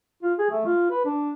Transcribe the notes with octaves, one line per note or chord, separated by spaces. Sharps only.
F4
G#4
A3
F4
B4
D4